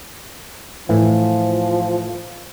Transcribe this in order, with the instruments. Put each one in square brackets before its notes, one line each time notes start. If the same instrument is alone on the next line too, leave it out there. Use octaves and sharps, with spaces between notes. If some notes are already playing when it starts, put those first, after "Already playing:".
[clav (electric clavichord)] A2 E3 [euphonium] F3